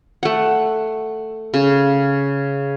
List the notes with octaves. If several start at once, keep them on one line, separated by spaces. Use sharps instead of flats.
A3 F#5
C#3